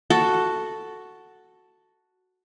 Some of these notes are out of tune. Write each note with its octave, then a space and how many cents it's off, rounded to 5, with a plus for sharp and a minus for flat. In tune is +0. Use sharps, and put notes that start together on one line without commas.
F#4 +0 A4 +0